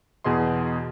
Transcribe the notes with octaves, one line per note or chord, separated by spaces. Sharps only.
E2 B2 G#4 D#5 C6